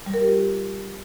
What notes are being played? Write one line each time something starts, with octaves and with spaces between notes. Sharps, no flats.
G3
A#4
G4
F4